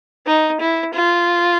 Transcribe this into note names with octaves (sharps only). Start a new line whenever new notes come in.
D#4
E4
F4